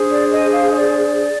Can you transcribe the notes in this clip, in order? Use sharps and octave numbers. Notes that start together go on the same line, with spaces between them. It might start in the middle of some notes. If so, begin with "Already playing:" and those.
Already playing: D4 G#4 C5
D5
D#5
F5
D#5
D5